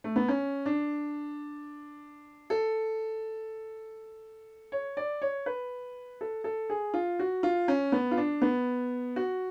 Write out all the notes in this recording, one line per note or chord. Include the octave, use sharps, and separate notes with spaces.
A3
B3
C#4
D4
A4
C#5
D5
C#5
B4
A4
A4
G#4
F4
F#4
F4
C#4
B3
F4
D4
B3
F#4